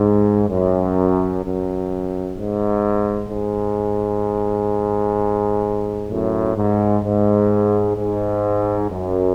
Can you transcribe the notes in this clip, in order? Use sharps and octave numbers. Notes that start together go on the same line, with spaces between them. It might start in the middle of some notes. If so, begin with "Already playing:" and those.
Already playing: G#2
F#2
F#2
G#2
G#2
F#2 A2
G#2
G#2
G#2
F#2